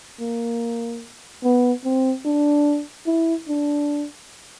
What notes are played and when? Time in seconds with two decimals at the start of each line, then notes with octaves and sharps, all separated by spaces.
0.20 A#3
1.44 B3
1.84 C4
2.25 D4
3.07 E4
3.48 D4